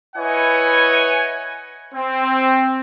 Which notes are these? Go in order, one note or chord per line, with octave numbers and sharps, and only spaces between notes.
E4 B4 C#5 D#5 F#5 G#5
C4